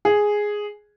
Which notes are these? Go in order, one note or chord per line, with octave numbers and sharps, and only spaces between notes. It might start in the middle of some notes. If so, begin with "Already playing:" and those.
G#4